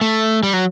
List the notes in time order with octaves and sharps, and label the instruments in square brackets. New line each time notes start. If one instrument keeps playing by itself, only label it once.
[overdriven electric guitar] A3
G3
F#3